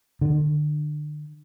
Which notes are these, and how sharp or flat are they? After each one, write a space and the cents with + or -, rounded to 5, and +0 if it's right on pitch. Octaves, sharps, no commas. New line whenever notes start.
D3 +35